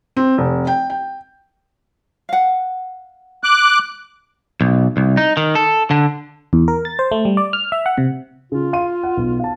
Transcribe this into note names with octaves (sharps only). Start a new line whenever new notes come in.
C4
F1
G5
G5
F5 F#5
D6 F#6
B1
C2
D#4
D#3
A4
D3
E2
A#4
A6
C5
A3
G3
D5
F6
E5
F#5
C3
C#3 F4
F5 C6 D#7
F#5
B1 B3
F5 A5